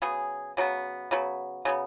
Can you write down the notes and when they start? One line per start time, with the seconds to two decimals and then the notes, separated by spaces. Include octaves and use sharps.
0.02 C#3 F#3 B3 G#4
0.57 C#3 F#3 B3
1.11 C#3 F#3 B3
1.65 C#3 F#3 B3